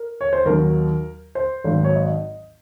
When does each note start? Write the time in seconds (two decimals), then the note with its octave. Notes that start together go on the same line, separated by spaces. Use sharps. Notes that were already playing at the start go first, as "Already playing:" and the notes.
Already playing: A#4
0.21 C#5
0.33 C5
0.46 D#2 D#3 F#3 A#4
1.35 C5
1.64 G#1 G#2 D#3 F#3
1.84 C#5
1.95 D#5